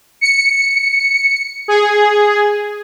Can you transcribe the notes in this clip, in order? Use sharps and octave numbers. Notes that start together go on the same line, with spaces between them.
C#7
G#4